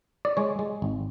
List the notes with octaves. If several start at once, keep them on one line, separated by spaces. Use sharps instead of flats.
D5
G#3 C#5
G#3
G#1